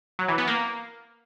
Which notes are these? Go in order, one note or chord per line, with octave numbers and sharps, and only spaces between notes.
F#3
E3
B3
A#3